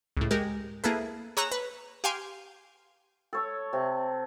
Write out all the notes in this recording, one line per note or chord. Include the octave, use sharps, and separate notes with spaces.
C#2 A2
G#3 G4 A#4
A#3 E4 G#4 A4 B4
G#4 C#5 A#5 E6 F#6
B4
G4 F5 G5 G#5 C6
A4 C#5
C3